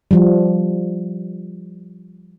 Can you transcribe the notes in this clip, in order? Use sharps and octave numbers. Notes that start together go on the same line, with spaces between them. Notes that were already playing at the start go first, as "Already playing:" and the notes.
F3 G3